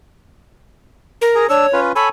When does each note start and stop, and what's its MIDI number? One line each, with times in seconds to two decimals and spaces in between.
1.21 1.48 70
1.35 1.47 68
1.35 1.47 82
1.49 1.66 62
1.49 1.80 73
1.49 1.66 88
1.73 1.92 61
1.73 1.92 65
1.73 1.92 71
1.96 2.09 69
1.96 2.09 73
1.96 2.09 80
1.96 2.08 83